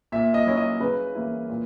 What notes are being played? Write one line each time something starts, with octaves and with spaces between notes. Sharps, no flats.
A#2 E5
D#5
F#3 C#4 E4
D#5
C#3 B4
E3 A#3 E4
A#2